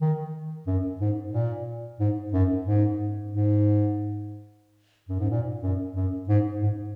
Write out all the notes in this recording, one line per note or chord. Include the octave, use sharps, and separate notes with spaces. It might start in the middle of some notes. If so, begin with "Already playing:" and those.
D#3
F#2
G#2
A#2
G#2
F#2
G#2
G#2
F#2
G#2
A#2
F#2
F#2
G#2
G#2